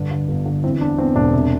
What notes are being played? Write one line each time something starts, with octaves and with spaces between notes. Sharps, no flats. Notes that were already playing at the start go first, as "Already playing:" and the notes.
Already playing: G2 D3
D3
G1
D3
E3 C4
E2 D4
E2 C4
E1 D4
C3